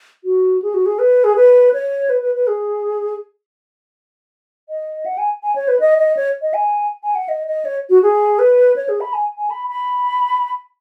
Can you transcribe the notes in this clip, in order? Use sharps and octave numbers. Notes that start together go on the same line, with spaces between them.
F#4
G#4
F#4
G#4
B4
G#4
B4
C#5
B4
B4
B4
G#4
D#5
F#5
G#5
G#5
C#5
B4
D#5
D#5
C#5
D#5
G#5
G#5
F#5
D#5
D#5
C#5
F#4
G#4
B4
C#5
G#4
B5
G#5
G#5
B5
B5